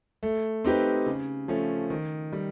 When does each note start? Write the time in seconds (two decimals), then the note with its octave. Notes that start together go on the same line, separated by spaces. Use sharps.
0.23 A3
0.64 C4 D#4 G4 B4
1.06 C#3
1.48 F3 A3 C#4
1.90 D#3
2.33 G3